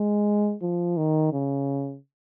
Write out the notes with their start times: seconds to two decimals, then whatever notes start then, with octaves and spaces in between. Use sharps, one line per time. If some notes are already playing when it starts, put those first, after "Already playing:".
Already playing: G#3
0.62 F3
0.97 D#3
1.33 C#3